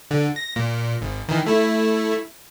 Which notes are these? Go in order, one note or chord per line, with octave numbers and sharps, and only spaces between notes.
D3
A#6
A#2
G#1
D#3 E3
A3 E4